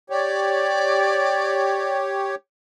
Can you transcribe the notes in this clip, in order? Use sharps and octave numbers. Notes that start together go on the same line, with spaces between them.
G4 C#5 D5